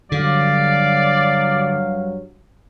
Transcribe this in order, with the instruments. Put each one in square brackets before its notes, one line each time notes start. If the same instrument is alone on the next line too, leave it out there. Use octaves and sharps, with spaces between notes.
[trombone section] G2 F#3 [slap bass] D3 [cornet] D5 [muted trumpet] F5